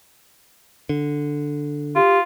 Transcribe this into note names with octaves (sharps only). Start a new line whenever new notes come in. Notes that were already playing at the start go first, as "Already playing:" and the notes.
D3
F4 G4